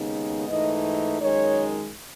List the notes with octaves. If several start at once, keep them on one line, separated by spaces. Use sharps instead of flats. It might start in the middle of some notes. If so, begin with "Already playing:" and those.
Already playing: D#2 C#3 G#3 B3 D#4
G#2 E3 A3 D#4 D#5
F#2 D#3 G#3 D#4 C#5